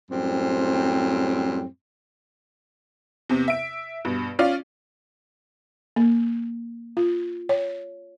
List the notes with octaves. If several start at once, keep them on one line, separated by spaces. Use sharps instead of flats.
F#2 A2 G3 C4
E2 C3
E5 D7
G2 B2
C#4 F4 D5 F5
A#3
F4
C#5